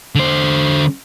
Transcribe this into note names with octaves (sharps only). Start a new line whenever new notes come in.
D3 C5